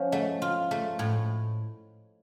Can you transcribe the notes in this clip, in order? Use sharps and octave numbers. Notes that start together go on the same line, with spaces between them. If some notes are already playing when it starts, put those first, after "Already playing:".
Already playing: F3 C#4 C5 C#5 D#5 F5 F#5
A3 D#5 F#5
F4
A3
A2